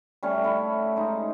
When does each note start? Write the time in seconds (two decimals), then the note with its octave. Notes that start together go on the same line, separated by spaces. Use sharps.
0.23 G3 A3 C#4
0.44 E4 A4
0.96 G#3 D#4